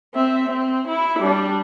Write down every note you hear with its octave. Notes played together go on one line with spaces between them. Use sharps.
C4 E5
C4
E4
G3 D4